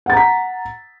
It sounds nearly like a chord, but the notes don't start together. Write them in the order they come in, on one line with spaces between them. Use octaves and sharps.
F#5 A6 A#5 B6